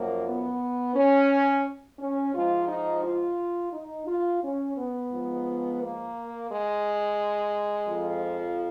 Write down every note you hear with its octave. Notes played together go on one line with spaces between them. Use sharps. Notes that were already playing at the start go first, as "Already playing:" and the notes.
Already playing: F#2 F3 A#3
B3
C#4
C#4
G#2 F3 F4
D#4
F4
D#4
F4
C#4
B3
G#2 F3
A#3
G#3
F2 F3